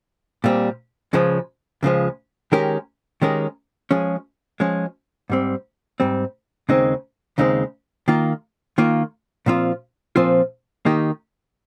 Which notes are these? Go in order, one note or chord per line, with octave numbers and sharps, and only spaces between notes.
A#2 G3 C4
C#2 C#3 F3 G#3
C#2 C#3 F3 G#3
D#3 G#3 C#4 G4 A#4
D#3 G#3 C#4 G4 A#4
F3 G#3 C#4 G#4
F3 G#3 C#4 G#4
G#2 G3 C4
G#2 G3 C4
D#2 C#3 G#3 C4 D#4
D#2 C#3 G#3 C4 D#4
D#3 A#3 F4
D#3 A#3 F4
A#2 F3 C4 F4
A#2 F3 C4 F4
D#3 A#3 D#4 G4